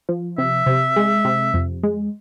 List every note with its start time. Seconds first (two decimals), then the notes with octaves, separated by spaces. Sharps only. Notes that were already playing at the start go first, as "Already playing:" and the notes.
0.09 F3
0.38 C3 E5
0.66 C3
0.96 G#3
1.25 C3
1.54 F2
1.83 G#3